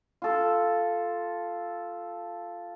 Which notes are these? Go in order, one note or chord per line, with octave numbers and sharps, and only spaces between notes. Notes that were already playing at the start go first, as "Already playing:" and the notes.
F4 A4